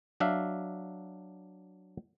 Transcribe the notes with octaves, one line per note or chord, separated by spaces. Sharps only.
F#3 D4 E5 F5